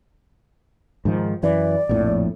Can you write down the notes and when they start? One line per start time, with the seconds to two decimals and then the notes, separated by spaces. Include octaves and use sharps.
1.05 G#2 D#3 F3
1.43 F#2 E3 D5
1.89 A#1 F2 A2